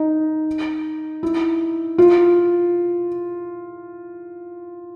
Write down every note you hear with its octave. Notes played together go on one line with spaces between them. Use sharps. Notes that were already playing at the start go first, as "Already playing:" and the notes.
Already playing: D#4
E4
F4